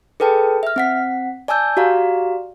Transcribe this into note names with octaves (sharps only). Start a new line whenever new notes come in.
G#4 A4 B4 G5 A5
E5 F6
C4 F#5 B6
D5 G#5 A5 E6 G6
F#4 G4 D5 F5 A#5